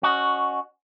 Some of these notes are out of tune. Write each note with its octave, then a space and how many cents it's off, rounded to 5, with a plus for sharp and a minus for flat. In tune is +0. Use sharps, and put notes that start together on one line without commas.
C#4 +10 F#4 +0 D#5 -20